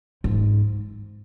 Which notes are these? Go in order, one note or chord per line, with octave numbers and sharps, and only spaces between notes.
G#2